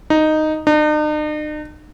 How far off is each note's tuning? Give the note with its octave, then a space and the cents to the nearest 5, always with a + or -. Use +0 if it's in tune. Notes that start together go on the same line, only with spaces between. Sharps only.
D#4 -5
D#4 -45